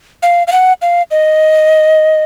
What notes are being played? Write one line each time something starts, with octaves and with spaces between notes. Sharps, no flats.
F5
F5
F#5
F5
D#5